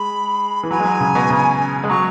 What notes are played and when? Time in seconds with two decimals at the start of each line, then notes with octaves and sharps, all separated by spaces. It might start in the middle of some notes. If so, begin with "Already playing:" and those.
Already playing: G#3 B5
0.63 E3
0.70 F#3 G#5
0.80 G#3
0.85 F#3
1.00 C#3
1.15 B2
1.30 C#3
1.84 G#3
1.89 F#3 C#6